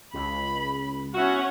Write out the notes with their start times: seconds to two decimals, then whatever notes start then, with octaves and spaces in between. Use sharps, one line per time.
0.14 C#2 B5
1.14 B3 C#4 E4 F#4 F#5